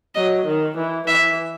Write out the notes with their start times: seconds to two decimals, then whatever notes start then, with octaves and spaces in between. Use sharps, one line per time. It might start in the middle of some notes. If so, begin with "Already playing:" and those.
0.15 F#3 D#5
0.46 D#3
0.77 E3
1.07 E3 E5